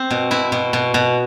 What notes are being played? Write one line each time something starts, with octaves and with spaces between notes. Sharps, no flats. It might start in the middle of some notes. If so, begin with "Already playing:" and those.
Already playing: C4
B2
B2 E4
B2
B2
B2